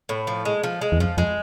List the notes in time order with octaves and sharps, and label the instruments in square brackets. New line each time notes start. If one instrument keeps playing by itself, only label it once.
[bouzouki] A2
F3
G#3
F3
G#3
[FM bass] E2
[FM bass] F2 [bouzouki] F3
[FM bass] F2 [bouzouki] G#3